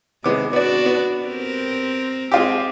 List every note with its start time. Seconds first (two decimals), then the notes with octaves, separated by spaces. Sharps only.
0.24 C3 D#3 G#3 B3 D6
0.53 B3 D4 F#4 D5
0.86 B3
1.25 C4 G4 A#4
2.32 G#3 C4 F4 G4